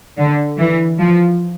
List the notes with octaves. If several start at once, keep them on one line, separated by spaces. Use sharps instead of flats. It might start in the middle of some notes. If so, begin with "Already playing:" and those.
D3
E3
F3